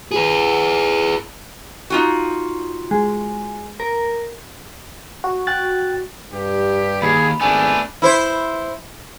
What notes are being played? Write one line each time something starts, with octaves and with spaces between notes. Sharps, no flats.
G#4 B4
D#4 F4 F#4
G#3
A#4
F#4
G5 F#6 A6
G2 G4
D#2 G#4 B5
G#1 A3 B3 D4 G#5
E4 C5